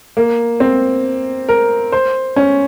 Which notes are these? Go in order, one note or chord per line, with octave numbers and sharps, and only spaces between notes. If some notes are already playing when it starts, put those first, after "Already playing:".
A#3
C4
A#4
C5
C#4